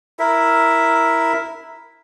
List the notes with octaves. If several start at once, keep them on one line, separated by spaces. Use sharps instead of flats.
E4 A#4 E5